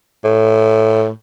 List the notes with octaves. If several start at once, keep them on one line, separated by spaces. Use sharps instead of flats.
A2